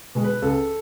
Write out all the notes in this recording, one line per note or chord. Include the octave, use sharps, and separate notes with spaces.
B2 G#3
B4
C#2 A4